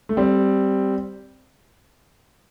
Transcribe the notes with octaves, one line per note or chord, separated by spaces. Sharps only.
A3
G3 C4